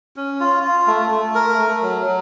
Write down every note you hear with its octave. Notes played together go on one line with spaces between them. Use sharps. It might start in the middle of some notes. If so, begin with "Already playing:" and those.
C#4
F4
F4
A3
A3
A#4
A3
F#3
F#3